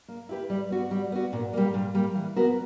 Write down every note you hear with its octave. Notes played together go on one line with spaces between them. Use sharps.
A#3
E4 G4 B4
G3
B3 F#4
G3
B3 F#4
A#2
G3 A#3
A#2
G3 A#3
E3
B3 F#4 A#4